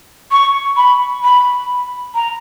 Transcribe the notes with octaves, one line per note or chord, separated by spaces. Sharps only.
C#6
B5
B5
A#5